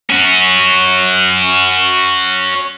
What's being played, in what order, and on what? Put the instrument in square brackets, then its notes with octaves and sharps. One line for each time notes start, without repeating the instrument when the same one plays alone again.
[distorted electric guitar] C#4 F#4